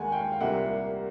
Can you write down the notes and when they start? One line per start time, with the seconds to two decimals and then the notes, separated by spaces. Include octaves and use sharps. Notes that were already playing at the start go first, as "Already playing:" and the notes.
Already playing: D#2 D#3 G#3 F#5 G#5
0.12 F5 G5
0.32 F5
0.40 C2 A#2 G3 A#3 E5 F#5